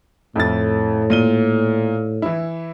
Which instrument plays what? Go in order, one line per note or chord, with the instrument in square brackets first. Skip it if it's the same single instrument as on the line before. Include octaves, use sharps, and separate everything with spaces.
[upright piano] F2 E4 A6 [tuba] A2
[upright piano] A#2 D#7 G7
E3 E4